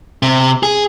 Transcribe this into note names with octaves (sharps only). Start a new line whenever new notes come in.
C3
G#4